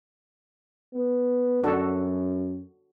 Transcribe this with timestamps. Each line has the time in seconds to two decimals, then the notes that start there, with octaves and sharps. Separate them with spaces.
0.94 B3
1.64 F#2 D4 F#4 A4